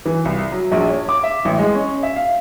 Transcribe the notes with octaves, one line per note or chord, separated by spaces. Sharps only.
E3
C2
F#3
A#1
C#5
D6
E5
A1
G#3
C#4
E5
F5